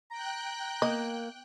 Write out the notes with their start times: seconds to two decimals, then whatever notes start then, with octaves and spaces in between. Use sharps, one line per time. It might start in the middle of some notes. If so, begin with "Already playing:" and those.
0.11 G5 A#5 F#6
0.82 A#3 D#5